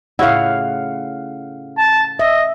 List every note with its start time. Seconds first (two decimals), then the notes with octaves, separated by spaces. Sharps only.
0.19 A2 C#3 E4 F5 F#5
1.77 A5
2.19 D#5 E5